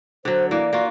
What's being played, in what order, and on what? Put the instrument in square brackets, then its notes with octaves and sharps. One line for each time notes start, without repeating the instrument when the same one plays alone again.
[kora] D3 F#3 [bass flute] C5
[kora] E3 A#3 [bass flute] D5
[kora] A#3 F4 F#4